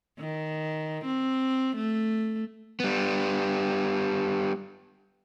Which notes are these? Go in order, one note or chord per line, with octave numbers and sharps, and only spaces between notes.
D#3
C4
A3
G3 B3